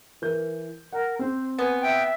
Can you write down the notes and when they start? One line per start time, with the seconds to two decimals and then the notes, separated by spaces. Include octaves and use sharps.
0.22 E3 A#4 G6
0.93 A#4 F#5
1.19 C4 C5
1.58 B3 G#5
1.83 E5 G5